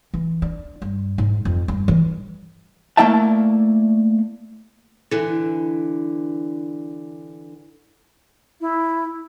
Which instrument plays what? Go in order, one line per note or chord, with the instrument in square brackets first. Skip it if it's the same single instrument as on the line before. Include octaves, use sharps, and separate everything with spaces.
[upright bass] E3
D4
G2
G#2
F2
G2
E3
[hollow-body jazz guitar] A3 A#3 E4 D5 E5 A5
[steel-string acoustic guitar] D3 E3
[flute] E4